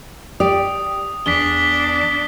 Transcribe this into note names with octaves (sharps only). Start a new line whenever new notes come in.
G4 D5 D#6
E2 D4 B6 G7